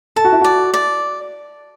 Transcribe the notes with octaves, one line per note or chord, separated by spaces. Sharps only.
A4 A5
F#4
E4
F#4 D5
D5